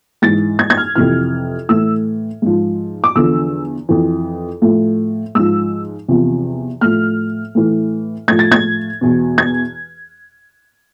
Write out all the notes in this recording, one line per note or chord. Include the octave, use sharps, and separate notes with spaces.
G#2 E3 A6
G#6
G#6
F6
F2 C3 E3 F6
A2 E3 E6
G#2 F3
D6
E2 D3 F3 E6
F2 E3
A2 F3
G#2 F3 E6
E2 C3 F3
A2 F3 F6
A2 E3
A2 F3 G#6
A6
G#6
E2 B2
G#6